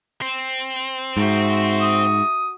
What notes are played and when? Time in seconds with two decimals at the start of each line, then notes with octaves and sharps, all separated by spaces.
0.22 C4
1.17 G#2 F#4 E5
1.81 D#6